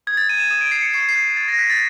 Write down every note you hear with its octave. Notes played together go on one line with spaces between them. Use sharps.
D#6 G#6
A6
G6 D#7
E7
D#6 E7
D7
G6 C7
C#7
C#6 C7
C7
F#6
C7
C#6 A6
A#6
F#6 B6
A6